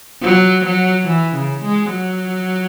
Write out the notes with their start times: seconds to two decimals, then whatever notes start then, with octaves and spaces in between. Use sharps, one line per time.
0.22 F#3
0.65 F#3
1.08 E3
1.35 C#3
1.64 G#3
1.91 F#3